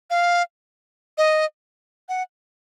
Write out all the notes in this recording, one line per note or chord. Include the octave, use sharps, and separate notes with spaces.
F5
D#5
F#5